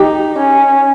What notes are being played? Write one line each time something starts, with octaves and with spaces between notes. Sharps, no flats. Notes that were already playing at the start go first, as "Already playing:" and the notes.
Already playing: D#4 G4
C#4